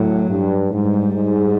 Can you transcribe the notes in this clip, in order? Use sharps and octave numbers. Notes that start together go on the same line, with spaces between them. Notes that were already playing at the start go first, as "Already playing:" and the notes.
Already playing: A2 F#3
G2
G#2 G3
G#2